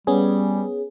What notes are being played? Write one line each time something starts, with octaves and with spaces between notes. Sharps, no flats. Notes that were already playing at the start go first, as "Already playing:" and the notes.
G3 B3 C#4 G#4